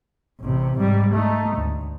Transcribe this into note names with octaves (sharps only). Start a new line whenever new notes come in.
A1 C3
G#2 G3
A3 D#4
D2